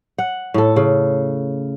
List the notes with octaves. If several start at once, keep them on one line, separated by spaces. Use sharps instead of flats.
F#5
A2 A4
C#3